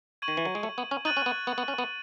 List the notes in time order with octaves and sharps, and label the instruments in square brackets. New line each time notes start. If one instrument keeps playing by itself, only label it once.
[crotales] C#6 G#6 D#7 F#7
[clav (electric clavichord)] D#3
E3
F#3
G#3
A3
B3
C#4
[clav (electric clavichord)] D#4 [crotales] F#6 A6 D#7 F#7
[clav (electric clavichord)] C#4
B3
B3
B3
C#4
B3